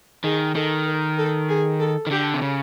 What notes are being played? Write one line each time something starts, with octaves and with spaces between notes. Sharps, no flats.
D#3 G#4
D#3 A4
A#4
A4
G#4
A4
D#3
D3 G4
C3
C#3